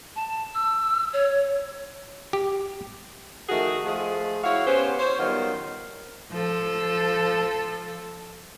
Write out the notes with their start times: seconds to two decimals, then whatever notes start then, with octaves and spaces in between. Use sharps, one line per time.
0.16 A5
0.55 E6
1.13 C#5
2.33 G4
3.49 D#3 F3 A3 F#4 G#4
3.85 F3 G#3 A3 G#4
4.44 E4 F#4 C#5 F5
4.66 B3 C#4 G4 C5
4.99 C5 C#5
5.19 D#3 F#3 G3 B3 F4
6.32 F3 A4